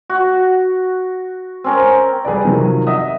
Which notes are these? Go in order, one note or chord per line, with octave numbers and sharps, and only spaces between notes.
F#4
C4 C#4 A#4
G3 G#4 B4 D5
C3 D#3 F3 F#3
D#5 E5 F#5 D#6